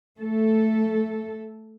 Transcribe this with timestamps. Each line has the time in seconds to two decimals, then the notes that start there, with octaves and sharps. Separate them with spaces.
0.19 A3 A4